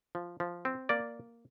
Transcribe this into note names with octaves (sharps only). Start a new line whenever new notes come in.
F3
F3
C4
A#3 D5